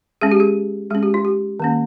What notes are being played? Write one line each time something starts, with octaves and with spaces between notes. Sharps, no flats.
G#3 C#4 G#4
G4
G#4
G#3 C#4 G#4
G4
F4
G4
D#3 A#3 C#4